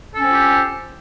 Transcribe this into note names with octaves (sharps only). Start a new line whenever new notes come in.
C4 C#4 F4 G4 A4